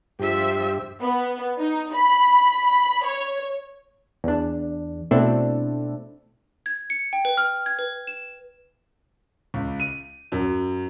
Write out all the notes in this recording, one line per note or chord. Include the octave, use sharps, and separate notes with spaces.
G2 F3 G4 E5
B3
D#4
B5
C#5
E2 D4
B2 A3 C4 D4 E4 A4
G#6
C#7
G5
B4
F6
G#6
B4
E7
C#2
D#7
F#2